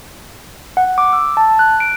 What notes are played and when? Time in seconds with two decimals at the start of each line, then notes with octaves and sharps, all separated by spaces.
0.77 F#5
0.98 D6
1.13 E6
1.37 A5
1.59 F#6
1.80 D7